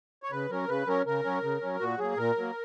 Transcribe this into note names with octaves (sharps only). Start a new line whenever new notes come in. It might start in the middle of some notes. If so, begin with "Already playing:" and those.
C#5
C#3 B4
F#3 C#4 A#4
C#3 B4
F#3 C#4 A#4
C#3 A#4
F#3 C#4
C#3
F#3 C#4
A#2 F#4
F#3 A#3 G#4
A#2 A#4
F#3 A#3